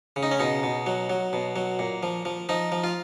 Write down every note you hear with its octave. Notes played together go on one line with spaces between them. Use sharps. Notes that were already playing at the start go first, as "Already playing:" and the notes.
C#3
D#4
C#4
B2 D#4
B2
F#3
F#3
B2
F#3
A#2
F3
F3
F3 D#4
F3
F4